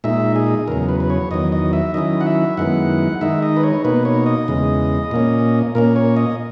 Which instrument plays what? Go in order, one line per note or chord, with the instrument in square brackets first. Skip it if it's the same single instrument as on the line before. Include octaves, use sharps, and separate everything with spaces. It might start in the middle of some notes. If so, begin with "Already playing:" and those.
[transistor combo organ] A#2 G#3 D#4 E5
G#4
E2 C#3 F#3 A#4
B4
B4
C#5
E2 D#3 F#3 D#5
D#5
E5
D#3 F#3 C#4 E4 D#5
F#5
E5
F#2 D#3 G#3 B3 E4 F#5
D#3 G#3 D#4 E5
D#5
B4
C#5
B2 A#3 D#4 B4
C#5
D#5
E2 C#3 G#3
A#2 A#3 C#4
A#2 A#3 C#4 A#4
C#5
D#5